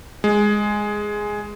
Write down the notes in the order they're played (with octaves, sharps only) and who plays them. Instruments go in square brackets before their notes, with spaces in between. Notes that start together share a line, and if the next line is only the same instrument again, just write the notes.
[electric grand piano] G#3